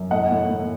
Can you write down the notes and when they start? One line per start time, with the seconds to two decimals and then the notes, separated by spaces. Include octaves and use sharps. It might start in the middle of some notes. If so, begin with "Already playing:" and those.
Already playing: F#2
0.11 A2 D#5 F#5
0.31 A2
0.49 A2